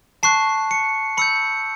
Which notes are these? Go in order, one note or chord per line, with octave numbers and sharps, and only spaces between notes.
A5 C#6 F#6 C7
C#7
B5 E6 G6 C#7